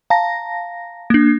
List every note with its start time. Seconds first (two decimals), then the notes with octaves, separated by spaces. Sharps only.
0.10 F5 A5 A#5 A#6
1.10 A#3 D4